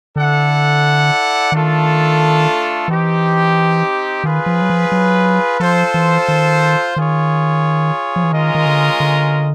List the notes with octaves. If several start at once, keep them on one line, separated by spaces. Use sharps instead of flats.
D3 E4 A4 D5 F#5
D#3 A3 D4 F4 A4
E3 C4 D#4 G4
D#3 F4 G#4 B4
F3
F#3
F3
F#3
F3 F4 A4 C5
E3
D#3
D#3 F4 G#4 C#5
F3
E3
D#3 G#3 C#4 F4 A#4 D#5
D#3
D3
D3